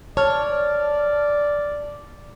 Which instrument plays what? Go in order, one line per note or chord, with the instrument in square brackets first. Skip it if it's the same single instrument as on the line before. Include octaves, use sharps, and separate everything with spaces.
[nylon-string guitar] C#5 [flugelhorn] D5 [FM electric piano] A5 F6